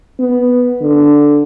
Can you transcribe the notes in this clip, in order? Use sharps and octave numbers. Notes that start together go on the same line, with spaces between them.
B3
D3